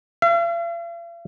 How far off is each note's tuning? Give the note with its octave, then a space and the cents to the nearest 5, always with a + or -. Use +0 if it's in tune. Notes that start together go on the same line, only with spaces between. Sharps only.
F5 -45